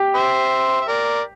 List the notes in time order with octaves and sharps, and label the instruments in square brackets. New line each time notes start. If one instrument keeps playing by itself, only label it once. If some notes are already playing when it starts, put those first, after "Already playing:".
Already playing: [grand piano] G4
[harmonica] C5 E5
E5
A#4 D5